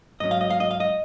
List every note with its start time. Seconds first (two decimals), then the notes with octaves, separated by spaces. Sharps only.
0.20 G#2 F#3 C#4 D#5
0.31 F5
0.41 D#5
0.50 F5
0.60 D#5
0.71 F5
0.80 D#5